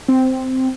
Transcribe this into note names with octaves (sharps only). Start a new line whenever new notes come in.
C4